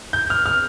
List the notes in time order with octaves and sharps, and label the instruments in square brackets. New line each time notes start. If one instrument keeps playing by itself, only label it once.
[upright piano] G6
F6
F6